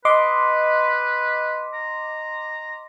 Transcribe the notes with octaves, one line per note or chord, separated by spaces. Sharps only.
B4 D#5 C6 D6
A#5